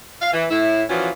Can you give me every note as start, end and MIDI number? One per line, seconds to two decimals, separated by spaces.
0.22 0.29 77
0.33 0.45 52
0.50 0.84 45
0.50 0.84 64
0.90 1.10 46
0.90 1.10 52
0.90 1.10 53
0.90 1.10 61
0.90 1.10 65
0.90 1.10 66